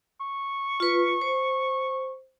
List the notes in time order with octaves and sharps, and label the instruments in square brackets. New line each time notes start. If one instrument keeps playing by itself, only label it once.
[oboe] C#6
[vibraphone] F4 B4
C5